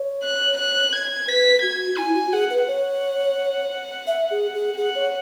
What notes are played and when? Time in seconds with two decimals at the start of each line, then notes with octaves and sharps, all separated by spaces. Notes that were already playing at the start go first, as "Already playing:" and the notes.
Already playing: C#5
0.22 F#6
0.58 F#6
0.92 G#6
1.27 B4 B6
1.62 F#4 G#6
1.97 E4 G#5
2.15 F#4
2.32 G#4 F#5
2.50 B4
2.67 C#5 F#5
4.07 E5
4.31 G#4
4.54 G#4
4.77 G#4 F#5
4.95 C#5